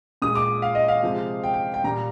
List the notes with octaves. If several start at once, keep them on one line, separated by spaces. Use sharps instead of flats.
A#2 G#3 D#6
D6
F5
D#5
F5
C3 F3 G#3
G5
G5
G5
A#2 G3 A#5